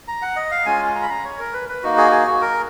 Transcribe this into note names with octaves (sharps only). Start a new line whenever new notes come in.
A#5
F#5
D#5
F5
G#3 C#4 F4 G#5
A#5
B5
A#5
C#5
A#4
B4
B4
A#3 D#4 F#4
G#4
G#4
F#4
A#4